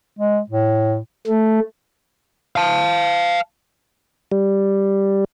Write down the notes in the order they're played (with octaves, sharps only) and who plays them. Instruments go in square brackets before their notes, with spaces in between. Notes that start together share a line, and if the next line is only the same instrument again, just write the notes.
[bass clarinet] G#3
A2
[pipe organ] A3
[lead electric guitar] F5 A5
[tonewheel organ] G3